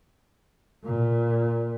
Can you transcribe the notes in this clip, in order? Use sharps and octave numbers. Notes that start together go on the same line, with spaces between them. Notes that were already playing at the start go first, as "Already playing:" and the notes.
A#2